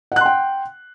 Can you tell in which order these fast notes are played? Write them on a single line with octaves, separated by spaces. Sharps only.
F#5 F#6 C6 G5